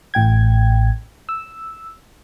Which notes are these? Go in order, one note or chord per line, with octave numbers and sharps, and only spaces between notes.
A1 A2 G5 G#6
E6